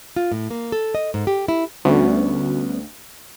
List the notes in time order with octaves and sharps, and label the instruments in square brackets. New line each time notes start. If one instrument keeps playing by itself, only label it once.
[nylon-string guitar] F4
A2
A#3
A4
D#5
G#2
G4
E4
[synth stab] D2 [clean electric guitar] G3 B3 C#4